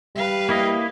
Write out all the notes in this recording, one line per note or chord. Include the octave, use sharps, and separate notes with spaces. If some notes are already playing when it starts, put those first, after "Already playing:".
G3 B4 F5
A#3 E4 D#5